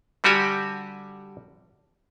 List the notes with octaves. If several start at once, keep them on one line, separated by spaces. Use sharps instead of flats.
D3 G3 F#4 G4 G#5